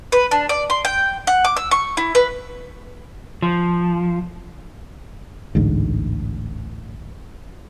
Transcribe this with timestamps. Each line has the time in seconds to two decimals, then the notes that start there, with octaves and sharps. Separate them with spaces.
0.12 B4
0.31 D4
0.49 D5
0.70 C6
0.85 G5
1.27 F#5
1.45 D6
1.57 E6
1.71 C#6
1.97 E4
2.15 B4
3.42 F3
5.55 A1 D2 G#2